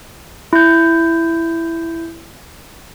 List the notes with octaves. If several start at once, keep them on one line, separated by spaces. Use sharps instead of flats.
E4 G6